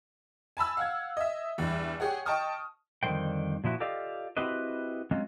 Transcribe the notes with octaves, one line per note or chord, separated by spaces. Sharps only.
G#5 A5 B5 E6
F5 F#5 G#6
D#5 E5
E2 G2
G4 G#4 C#5 F#5
D#5 G5 A5 C#6 D#6 F6
F2 D3 D#3 G3 C5 G5
A#2 F3 E4 F#4
F4 G4 A4 D5 D#5 F5
C4 E4 F#4 G4 B4 D#5
F#3 G#3 C4 C#4 F4